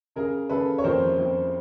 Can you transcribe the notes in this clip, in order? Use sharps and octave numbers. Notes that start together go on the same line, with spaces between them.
C#3 G#4 A#4
C#3 A4 B4
C#5
F2 A#4 C5
F2